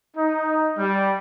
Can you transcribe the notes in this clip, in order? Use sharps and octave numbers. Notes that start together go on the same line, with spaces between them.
D#4
G3